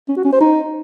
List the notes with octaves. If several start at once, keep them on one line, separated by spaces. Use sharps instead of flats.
C#4
F#4
C#4
C5
D#4